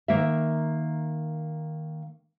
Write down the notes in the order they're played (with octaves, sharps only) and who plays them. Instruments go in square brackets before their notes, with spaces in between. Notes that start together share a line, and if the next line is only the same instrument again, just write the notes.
[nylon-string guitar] D#3 A#3 E5